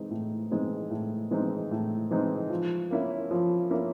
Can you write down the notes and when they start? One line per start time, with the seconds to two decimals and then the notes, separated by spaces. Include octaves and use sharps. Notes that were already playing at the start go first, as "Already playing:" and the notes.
Already playing: E3 G#3 C4 D#4
0.10 A2
0.51 E3 G#3 C4 D#4
0.90 A2
1.31 E3 G#3 C4 D#4
1.71 A2
2.11 E3 G#3 C4 D#4
2.50 F3
2.91 A#3 C#4 E4
3.31 F3
3.70 A#3 C#4 E4